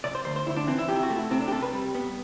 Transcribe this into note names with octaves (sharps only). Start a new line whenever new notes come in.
C3 D5
C5
D2 C5
C5
D2 E4
D4
E3 C4
E4
C3 G4
E4
F#4
A3
E4
C3 C4
D4
G4
C3 A4
B4
G3
B3